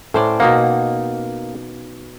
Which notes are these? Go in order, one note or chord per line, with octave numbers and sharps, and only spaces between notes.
A2 C#4 C5 D5
B2 A#3 D#4 F#5